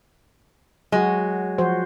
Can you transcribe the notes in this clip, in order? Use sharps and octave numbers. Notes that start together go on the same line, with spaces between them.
F#3 G#3 F#4
F3 F#4 C5